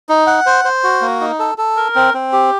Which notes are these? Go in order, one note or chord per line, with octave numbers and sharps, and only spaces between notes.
D#4
F#5
C5
C5
F#4
A#3
D#4
A4
A4
A#4
C4
C4
G4